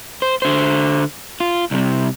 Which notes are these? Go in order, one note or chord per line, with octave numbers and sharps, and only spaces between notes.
C5
D3 C5
F4
C2 C3